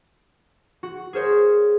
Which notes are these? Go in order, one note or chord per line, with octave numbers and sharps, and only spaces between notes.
F#4
G#4 A#4 C5 C#5